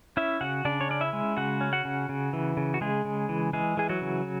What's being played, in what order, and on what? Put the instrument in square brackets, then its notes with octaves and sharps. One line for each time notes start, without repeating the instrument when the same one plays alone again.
[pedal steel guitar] C#4 E4 E5
C#3 F#4 F#5
C#3 D4 D5
C#5
C#4 D5
E4 E5
G#3
C#3 F#4 F#5
C#4
F#4 F#5
C#3
C#3
E3
C#3
F#4
C#3 G#3 G#4
C#3
E3
E3 G#3 G#4
E3 G#4
F#3 F#4
C#3